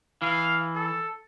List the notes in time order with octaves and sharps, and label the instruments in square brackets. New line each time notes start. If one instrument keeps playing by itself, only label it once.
[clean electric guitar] E3 [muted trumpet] F5
[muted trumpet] A4